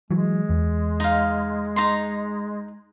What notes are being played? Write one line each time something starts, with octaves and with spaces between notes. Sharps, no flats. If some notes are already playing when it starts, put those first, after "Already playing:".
E3 F#3 G#3
E2
D#4 F5
D#4 A#5 C6